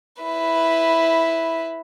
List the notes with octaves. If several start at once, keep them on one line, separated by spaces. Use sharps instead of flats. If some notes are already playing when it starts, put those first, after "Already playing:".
E4 B4